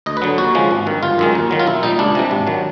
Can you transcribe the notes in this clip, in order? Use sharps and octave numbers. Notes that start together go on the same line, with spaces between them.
D2 D#5
B4
D3 F#3
D#2 F#4
C#3 F3 G#3
G#1
G2 D#3
G1 F4
F#2 D#3 G#3
D#2
D#3 F#3
F4
B1 E4
A#2 G3 D#4
C#2 D4
C3 E3 G3
G#1
D#3 F#3